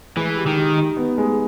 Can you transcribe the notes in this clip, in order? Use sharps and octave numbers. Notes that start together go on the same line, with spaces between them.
E3 G#3
G4
D#3
G4
D#4
B3
G#3